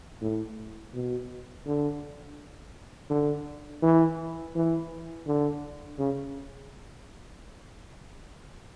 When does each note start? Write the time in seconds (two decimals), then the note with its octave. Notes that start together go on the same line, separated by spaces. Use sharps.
0.21 A2
0.94 B2
1.66 D3
3.10 D3
3.82 E3
4.55 E3
5.27 D3
5.99 C#3